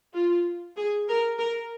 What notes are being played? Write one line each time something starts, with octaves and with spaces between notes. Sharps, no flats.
F4
G#4
A#4
A#4